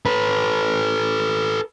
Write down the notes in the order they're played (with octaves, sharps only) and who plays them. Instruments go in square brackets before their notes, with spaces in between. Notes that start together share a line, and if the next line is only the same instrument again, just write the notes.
[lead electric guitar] A4 B4